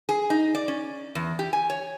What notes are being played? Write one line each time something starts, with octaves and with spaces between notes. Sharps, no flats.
G#4
D#4
D5
C#4
E2
G4
G#5
C#5